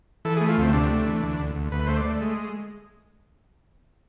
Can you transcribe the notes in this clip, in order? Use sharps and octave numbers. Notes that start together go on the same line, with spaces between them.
E3 A4
G#4
A3
F4
D2 C4
C3 D4
A3
E3
D2
D2
D2
D2 B4
A3 C5
D5
A3
G#3